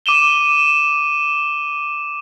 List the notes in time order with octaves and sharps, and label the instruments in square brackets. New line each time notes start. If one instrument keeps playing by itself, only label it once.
[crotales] D6 D#7 E7 G7